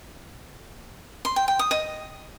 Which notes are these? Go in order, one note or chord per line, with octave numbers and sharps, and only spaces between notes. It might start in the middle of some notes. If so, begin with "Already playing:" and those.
C6
G5
G5
D#6
D#5